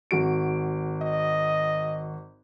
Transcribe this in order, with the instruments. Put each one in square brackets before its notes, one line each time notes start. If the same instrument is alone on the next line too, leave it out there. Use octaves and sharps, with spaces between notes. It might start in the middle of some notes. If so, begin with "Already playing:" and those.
[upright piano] G#1 F#4 D7
[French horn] D#5